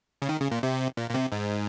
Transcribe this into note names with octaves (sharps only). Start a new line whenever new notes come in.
C#3
D#3
C#3
A#2
C3
A#2
A#2
C3
G#2